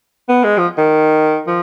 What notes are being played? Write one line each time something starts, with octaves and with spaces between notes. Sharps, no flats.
B3
G#3
F3
D#3
F3